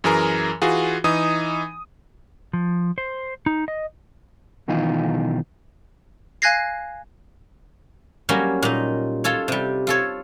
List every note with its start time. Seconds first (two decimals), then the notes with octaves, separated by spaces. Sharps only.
0.04 F#2 E3 G#4 A#4 A#5
0.62 E3 F4 F#4 G#4
1.04 E3 D#4 D#6
2.53 F3
2.98 C5
3.46 D#4
3.68 D#5
4.68 B1 B2 D#3 E3 D#4 F4
6.42 F5 G#5 F#6 G#6 A#6 C7
8.29 F#3 G3 A#3 C#4 F#4 A#4
8.63 A#2 D#4
9.24 F4 A4 C#5
9.48 C3 G3
9.87 F4 A4 C#5